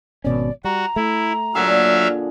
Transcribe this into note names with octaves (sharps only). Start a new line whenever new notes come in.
G#1 B2 C#4 D5
G3 F#4 A#5
A3 E4
A#2 D3 F#3 G#4 E5 F5